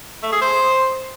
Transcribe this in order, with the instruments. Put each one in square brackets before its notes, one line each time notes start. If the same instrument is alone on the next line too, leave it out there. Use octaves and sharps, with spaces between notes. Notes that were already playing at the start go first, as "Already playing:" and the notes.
[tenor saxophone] A3
G#4
C5